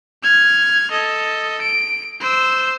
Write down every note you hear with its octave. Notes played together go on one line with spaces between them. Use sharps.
F6 G#6
A4 D#5
D7
C5 E6